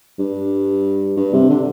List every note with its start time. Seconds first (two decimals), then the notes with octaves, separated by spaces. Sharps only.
0.19 G2
1.17 G2
1.34 C3
1.50 D3